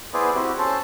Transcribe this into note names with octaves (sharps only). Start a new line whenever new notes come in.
B3 E4 G#4 B4 C5 D5
C4 E4 F#4 G4
C#4 A4 C5 A5